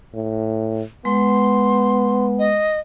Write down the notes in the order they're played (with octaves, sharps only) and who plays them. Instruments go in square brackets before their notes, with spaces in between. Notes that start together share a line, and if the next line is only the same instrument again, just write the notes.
[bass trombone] A2
[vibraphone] G#3 [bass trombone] B3 [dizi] C6
[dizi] D#5